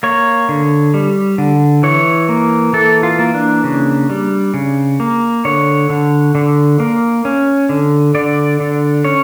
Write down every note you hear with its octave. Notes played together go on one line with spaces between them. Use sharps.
A#3 C#5
D3
G3
D3
E3 C#5
A#3
E3 A4
F4
A#3
D4
C#3
G3
C#3
A#3
D3 C#5
D3
D3
A#3
C#4
D3
D3 D5
D3
C#4 C#5